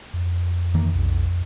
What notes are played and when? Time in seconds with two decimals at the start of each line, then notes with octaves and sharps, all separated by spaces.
0.14 F2
0.74 D#3 E3 A#3
0.94 B1